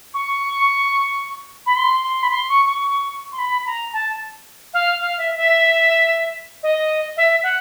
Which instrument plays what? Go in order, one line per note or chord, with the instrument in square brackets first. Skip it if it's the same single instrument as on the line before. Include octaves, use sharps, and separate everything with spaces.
[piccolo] C#6
B5
C6
C6
B5
C6
C#6
C#6
C6
B5
A#5
A5
F5
F5
E5
E5
D#5
E5
F#5